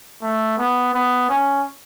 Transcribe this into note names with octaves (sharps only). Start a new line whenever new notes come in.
A3
B3
B3
C#4